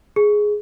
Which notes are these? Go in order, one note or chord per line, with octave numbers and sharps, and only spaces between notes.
G#4